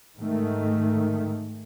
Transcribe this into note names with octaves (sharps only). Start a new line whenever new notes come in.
G#2 D#3 A3